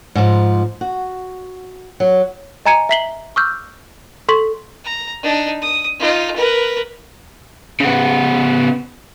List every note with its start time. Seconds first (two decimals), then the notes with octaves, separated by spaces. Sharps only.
0.15 G#2 F3
0.81 F#4
2.00 F#3
2.66 D#5 G#5 A#5 G#6 C#7 D#7
2.89 E5 A#5 B6 C7 F#7 G7
3.36 C#6 D6 E6 F6 G6
4.28 A4 C6 C#6 B6 F#7
4.84 A#5
5.23 D4 D#4
5.61 D#6
5.99 D#4 F4
6.35 A#4 B4
7.80 C#3 B3